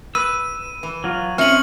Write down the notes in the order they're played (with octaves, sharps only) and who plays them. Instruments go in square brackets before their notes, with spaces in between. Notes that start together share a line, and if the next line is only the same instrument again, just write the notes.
[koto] B4 [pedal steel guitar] E6 [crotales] D#7
[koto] E3
[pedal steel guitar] F#3 F4
[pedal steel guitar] C4 [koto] C#4 D#4 [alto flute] E5 [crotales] F6 C#7 F#7